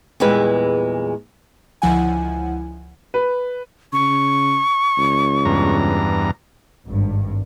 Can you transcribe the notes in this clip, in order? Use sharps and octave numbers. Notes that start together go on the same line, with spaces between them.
E2 A#2 G3 G#3 E4 B4
C#2 D3 F3 E4 F#5 G#5
B4
C#3 C#6
C#2
E2 G2 A#5
G#1 G2